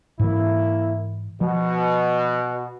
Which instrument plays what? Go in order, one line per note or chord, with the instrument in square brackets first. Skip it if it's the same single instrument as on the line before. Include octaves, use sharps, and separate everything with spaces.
[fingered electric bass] G#2 E3 [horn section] A#3 E4
[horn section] B2 [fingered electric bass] F3